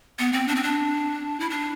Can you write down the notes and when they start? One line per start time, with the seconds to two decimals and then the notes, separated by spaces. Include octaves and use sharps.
0.19 B3
0.33 C4
0.48 D4
0.55 C4
0.63 D4
1.40 E4
1.50 D4